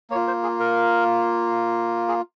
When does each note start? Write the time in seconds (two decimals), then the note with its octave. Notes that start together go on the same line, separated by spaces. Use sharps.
0.10 A#3 C#5
0.15 F4
0.28 C5
0.43 G#4
0.60 A#4
2.08 G#4